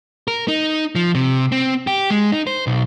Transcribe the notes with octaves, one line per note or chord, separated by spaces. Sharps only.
A#4
D#4
F3
C3
C4
G4
G#3
D#4
C5
B1